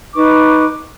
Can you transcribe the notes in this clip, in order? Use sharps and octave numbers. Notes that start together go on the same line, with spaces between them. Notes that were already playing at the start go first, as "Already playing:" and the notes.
D#4 B4 C#6 D6